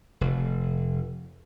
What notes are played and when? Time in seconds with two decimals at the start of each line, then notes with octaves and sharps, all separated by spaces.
0.21 F1